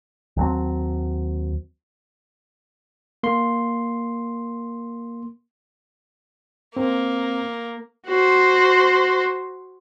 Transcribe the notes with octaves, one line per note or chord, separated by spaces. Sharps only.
D#2 F#3 C4
A#3 C6
A#3 C4
F#4 C5